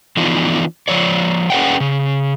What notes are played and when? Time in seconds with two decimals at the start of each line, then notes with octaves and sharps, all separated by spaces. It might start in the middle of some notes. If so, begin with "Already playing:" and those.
0.17 E3 F3 B3 D4 D#4 F4
0.88 F3 C#5 D5
1.50 C#4 G#4 B4 D5 F#5 G5
1.80 C#3